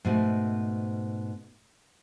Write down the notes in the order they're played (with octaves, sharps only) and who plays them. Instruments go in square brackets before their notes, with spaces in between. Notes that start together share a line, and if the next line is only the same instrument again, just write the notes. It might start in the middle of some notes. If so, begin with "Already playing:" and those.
[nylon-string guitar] G#2 B2 A3